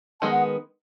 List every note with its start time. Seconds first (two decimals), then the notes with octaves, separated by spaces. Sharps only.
0.21 D#3 G#3 B3 A5
0.31 F#5